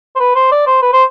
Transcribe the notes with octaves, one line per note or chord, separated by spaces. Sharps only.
C5
B4
C5
D5
C5
B4
C5